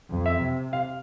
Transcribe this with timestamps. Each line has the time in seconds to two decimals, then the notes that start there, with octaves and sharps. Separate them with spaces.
0.10 F2
0.26 E5
0.41 C3
0.73 F5